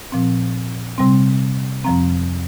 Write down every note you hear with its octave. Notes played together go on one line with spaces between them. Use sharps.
A#2 F3 C4
C3 G3 C4 C6
F2 F3 C4 A#5